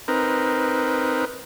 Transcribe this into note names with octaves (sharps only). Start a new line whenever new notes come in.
C4 D#4 A#4 B4